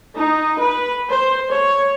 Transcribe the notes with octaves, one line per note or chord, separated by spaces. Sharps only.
D#4
B4
C5
C#5